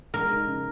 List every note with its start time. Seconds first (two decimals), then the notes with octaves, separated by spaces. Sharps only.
0.14 G#3 A#4
0.30 D#4
0.46 C#3